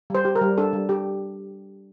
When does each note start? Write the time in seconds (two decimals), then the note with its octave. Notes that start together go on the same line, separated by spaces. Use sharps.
0.10 G3 C5
0.25 G4
0.35 A#4
0.41 G3
0.58 D4 A4
0.73 G3
0.89 G4